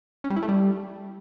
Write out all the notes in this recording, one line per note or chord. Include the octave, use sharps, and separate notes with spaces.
C#4
G3
E4
A3
G3